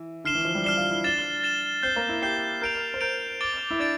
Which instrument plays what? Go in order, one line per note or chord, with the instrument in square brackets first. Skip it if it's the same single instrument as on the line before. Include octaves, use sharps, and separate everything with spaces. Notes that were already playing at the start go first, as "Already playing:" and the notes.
Already playing: [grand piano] E3
[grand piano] D3 [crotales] F6 C7 E7 G7
[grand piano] E3
F3
G3
[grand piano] D4 [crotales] F6 C7 E7 G7
[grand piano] F4
E4
[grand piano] D4 [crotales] A6 E7 G7
[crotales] A6 E7 G7
[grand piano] C4 [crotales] G6 C7 G7
[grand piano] A#3
E4
[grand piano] G4 [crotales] G6 C7 G7
[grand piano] A#4 [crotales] G6 D7 F7
[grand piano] C5
[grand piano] A#4 [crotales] G6 D7 F7
[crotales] D6 A6 D7 G7
[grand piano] E4
[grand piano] D4 [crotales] D6 A6 D7